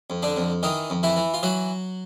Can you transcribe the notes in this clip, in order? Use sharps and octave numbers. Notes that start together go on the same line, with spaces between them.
F2
D3 D4
F2
D#3 E3 D#4
F2
E3 E4
E3
F4
E3 F#3 F#4